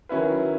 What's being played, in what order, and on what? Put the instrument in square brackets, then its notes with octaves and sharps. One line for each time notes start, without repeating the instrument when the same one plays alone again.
[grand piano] D#3 F#3 C#4 E4 B4